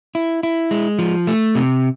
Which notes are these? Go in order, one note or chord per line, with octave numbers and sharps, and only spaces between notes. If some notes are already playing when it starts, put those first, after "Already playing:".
E4
E4
G#3
F3
A3
C3